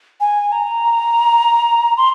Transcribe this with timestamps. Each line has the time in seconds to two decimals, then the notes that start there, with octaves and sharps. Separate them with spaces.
0.20 G#5
0.52 A#5
1.97 C6